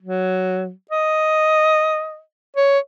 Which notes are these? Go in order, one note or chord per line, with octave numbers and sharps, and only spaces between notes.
F#3
D#5
C#5